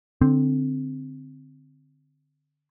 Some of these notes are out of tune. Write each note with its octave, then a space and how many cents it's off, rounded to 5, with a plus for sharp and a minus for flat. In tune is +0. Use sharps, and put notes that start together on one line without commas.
D3 +0 C4 +0